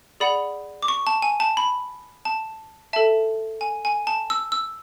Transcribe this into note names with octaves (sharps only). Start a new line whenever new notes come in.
G#4 D5 F#5 B5
D6
C#6
A5
G#5
A5
B5
A5
A4 E5 A5
G#5
G#5
A5
E6
E6